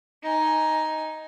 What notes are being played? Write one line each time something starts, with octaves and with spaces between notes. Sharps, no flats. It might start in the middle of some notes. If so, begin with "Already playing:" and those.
D#4 G#5